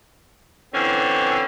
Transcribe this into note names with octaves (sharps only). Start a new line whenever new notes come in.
D3 E3 C4 C#4